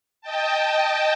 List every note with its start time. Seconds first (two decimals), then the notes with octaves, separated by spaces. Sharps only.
0.21 D#5 G5 A5